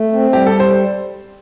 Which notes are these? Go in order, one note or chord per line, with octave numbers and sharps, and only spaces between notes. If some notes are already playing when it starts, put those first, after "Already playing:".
Already playing: A3
C4
G3 G4
A4
C5